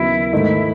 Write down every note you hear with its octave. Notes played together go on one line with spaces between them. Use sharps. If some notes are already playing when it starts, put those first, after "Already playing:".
Already playing: D#2 C#3 F#3 B3 D#4 E4
G#2 D#3 A3 D#4